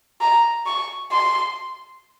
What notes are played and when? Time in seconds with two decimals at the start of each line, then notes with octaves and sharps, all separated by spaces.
0.21 A#5
0.67 C#6
1.12 C6